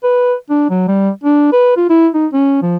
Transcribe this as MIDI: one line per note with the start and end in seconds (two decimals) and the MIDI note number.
0.03 0.34 71
0.50 0.67 62
0.70 0.85 54
0.88 1.10 55
1.24 1.51 62
1.52 1.72 71
1.77 1.88 65
1.90 2.08 64
2.14 2.27 63
2.33 2.58 61
2.62 2.77 53